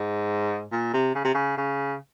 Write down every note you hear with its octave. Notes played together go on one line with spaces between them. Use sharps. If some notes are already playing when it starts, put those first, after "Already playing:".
Already playing: G#2
A#2
C3
C#3
C3
C#3
C#3